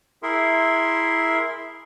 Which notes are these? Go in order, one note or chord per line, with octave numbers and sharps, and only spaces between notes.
E4 G#4 A#4 E5 C6